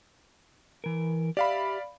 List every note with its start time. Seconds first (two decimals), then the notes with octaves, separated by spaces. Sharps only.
0.84 E3 A#4
1.37 G4 D5 E5 F5 B5